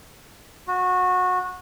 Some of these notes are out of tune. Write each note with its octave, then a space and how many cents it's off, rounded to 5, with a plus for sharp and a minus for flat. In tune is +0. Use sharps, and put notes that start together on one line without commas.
F#4 -20